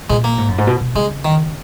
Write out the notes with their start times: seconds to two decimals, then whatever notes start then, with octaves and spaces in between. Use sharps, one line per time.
0.10 A#2 G#3
0.24 A#3
0.38 G#2
0.48 F#2
0.58 G#2
0.67 B2
0.81 B2
0.95 C#3 G#3
1.25 D#3